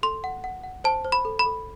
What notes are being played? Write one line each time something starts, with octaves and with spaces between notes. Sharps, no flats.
A4 C6
F#5
F#5
F#5
C5 A5
C5
B5
A4
B5
A4